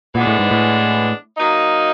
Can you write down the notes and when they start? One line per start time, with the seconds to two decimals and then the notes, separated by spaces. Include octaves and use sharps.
0.15 A#2 E3 G#3 B3 D4
0.27 A2
0.39 G#2
0.51 A2
1.37 F#3 A#3 D#4